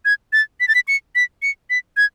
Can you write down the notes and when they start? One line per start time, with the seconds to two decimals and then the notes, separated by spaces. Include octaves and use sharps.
0.05 G#6
0.33 A6
0.60 B6
0.68 A6
0.75 B6
0.88 C#7
1.15 B6
1.42 C#7
1.70 B6
1.97 G#6